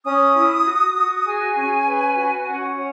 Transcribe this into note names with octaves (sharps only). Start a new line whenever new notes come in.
C#4 D#6
E4
F#4
F#4
G#4 G#5
C#4
B4
F#4
C#4 F#5
C#5